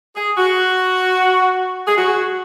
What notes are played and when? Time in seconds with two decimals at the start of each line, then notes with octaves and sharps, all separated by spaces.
0.15 G#4
0.37 F#4
1.86 G#4
1.97 F#4